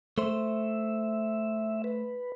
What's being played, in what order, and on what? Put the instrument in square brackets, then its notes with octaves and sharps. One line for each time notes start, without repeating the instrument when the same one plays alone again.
[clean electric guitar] A3 C5 [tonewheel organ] E5
[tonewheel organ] B4